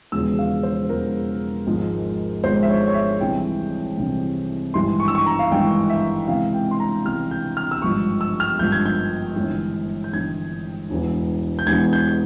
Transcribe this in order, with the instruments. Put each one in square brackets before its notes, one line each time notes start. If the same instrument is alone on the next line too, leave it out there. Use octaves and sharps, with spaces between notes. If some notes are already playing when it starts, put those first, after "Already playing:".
[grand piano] E1 E2 C#3 F3 E6
F5
C5
E1 E2 C#3 F3 A#4
G#1 G#2 F3
G#1 G#2 F3 C5
E5
C#5
C#5
E5
C2 C3 E3 G5
C2 C3 E3
G#1 G2 E3 C6
C#6
E6
C#6
A#5
F5
G#1 G2 E3 G5
E5
C#2 C3 E3 F5
G5
C6
A#5
C#2 C3 E3 F6
G6
F6
E6
G#1 G2 F3 C#6
E6
F6
G#1 G2 F3 G6
G#6
G6
G1 G2 E3
G6
G1 G2 E3 G#6
E1 E2 E3
G6
E1 E2 E3 G#6
G6